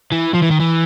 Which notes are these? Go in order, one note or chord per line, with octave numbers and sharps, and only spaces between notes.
E3
F3
E3
D#3
E3